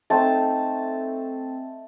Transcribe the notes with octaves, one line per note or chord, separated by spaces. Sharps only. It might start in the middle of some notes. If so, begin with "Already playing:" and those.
A3 C4 D#4 A5